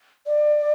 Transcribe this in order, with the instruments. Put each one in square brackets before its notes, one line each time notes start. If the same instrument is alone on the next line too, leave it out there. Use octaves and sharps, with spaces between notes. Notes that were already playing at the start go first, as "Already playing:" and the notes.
[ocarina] D5